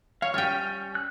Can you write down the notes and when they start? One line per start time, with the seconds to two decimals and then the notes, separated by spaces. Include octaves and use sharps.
0.22 C#5 F5
0.34 G3 C#4 C#5 G5 F6
0.95 F#6